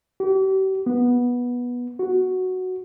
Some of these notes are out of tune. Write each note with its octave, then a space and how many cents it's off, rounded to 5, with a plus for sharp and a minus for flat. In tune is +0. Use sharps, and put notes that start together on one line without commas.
G4 -40
B3 -15
F#4 +0